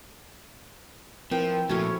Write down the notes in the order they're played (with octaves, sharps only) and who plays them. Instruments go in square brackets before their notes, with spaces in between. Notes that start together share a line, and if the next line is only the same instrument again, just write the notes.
[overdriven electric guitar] F3 [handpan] C4 E4 B4 [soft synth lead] A#4 [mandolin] G5
[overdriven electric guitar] A#2 A3 [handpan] F3 E4 A4 [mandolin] C#4 C#5 [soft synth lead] F#4